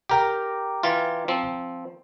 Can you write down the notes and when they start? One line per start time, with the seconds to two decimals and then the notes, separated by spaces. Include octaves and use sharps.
0.09 G4 A#4 G5 A#5 D6
0.83 E3 F4
1.28 F3 C4